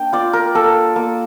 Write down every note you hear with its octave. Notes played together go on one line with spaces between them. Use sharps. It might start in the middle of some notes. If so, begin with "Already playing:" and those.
Already playing: A#3 D4 G5
F4 D5
A#4
A#3 A4
A#3